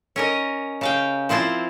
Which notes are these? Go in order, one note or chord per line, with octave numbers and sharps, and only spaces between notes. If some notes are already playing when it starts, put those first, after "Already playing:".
C#4 A#4 D#5
C#3 F5 G5
F3 C4 E4 F4 C5